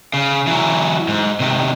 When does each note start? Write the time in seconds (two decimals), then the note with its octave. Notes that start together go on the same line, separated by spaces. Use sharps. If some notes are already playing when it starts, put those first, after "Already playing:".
0.13 C#3
0.47 E3 F#3
1.08 G#2
1.40 C3 D#3